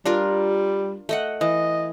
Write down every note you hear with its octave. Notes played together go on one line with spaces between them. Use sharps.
G3 D4 F4 A#4
A3 D#5 F#5
E3 D#5